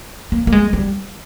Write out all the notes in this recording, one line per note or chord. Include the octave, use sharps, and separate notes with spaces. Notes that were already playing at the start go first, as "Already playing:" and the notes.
A#3
A#3
G#3
G3